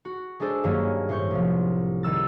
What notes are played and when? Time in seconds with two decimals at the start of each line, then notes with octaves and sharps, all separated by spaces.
0.05 F#4
0.40 G#3 D4 G#4 A4 C5
0.64 G2 D#3 F#3 A#3 C#4
1.09 A2 C5 C#5 C#6 G6
1.31 C2 F3
2.03 D#3 G3 E6 A6